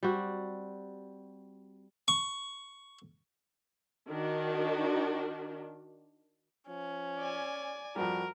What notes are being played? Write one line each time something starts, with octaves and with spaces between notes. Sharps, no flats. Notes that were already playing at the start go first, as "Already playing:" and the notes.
G3 C4 F#4
C#6
D#3 D4 F#4
F3 C#4
D5 G#5
F2 G3 F#4 A#4